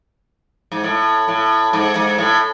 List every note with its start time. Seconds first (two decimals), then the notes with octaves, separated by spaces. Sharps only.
0.72 G#2
0.84 A2
1.28 A2
1.73 G#2
1.96 G#2
2.18 A2